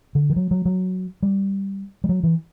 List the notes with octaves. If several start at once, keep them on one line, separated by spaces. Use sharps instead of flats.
D3
E3
F#3
F#3
F#3
G3
G3
F#3
E3